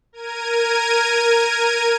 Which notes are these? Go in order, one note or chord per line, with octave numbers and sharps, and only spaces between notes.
A#4 G#6 D#7